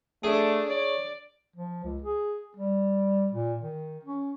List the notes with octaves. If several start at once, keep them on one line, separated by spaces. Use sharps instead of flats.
A3 D4 G#4
C#5 D5
F3
C#2
G#4
G3
A#2
D#3
C#4